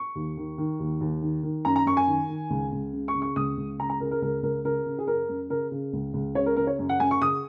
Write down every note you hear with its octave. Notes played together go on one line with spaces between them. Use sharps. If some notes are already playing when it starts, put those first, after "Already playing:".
Already playing: C#6
D#2
D#3
D#3
D#2
D#2
D#3
D#3
F#2 A#5
A#5
F#2 C#6
G#5
D#3
D#3
C#2
C#2
C#3
C#6
C#3
C#6
C#2 D#6
C#2
C#3 A#5
A#5
C#3 A#4
A#4
C#2 A#4
C#2 A#4
C#3 A#4
C#3
G#4
F#2 A#4
F#2
C#3 A#4
C#3
C#2
C#2
C#3 C#5
A#4
C#3 A#4
C#5
F#2
F#5
F#2 G#5
C#6
C#3 D#6